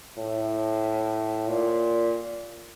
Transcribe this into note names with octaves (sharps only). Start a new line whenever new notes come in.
A2
A#2